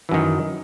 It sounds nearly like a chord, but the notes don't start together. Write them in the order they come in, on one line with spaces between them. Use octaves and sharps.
E3 F#2 D#3